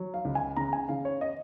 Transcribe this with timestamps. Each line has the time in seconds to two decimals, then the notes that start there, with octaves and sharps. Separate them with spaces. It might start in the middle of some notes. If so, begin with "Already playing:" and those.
Already playing: F#3
0.14 F5
0.25 C#2
0.35 G#5
0.57 C#3 A#5
0.73 G#5
0.89 C#3 F5
1.05 C#5
1.21 D#5